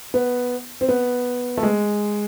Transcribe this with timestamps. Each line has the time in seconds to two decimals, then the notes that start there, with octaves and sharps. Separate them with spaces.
0.14 B3
0.81 C4
0.89 B3
1.57 A3
1.63 G#3